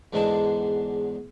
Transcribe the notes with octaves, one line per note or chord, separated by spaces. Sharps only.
E2 G#2 D3 G#3 D4 A5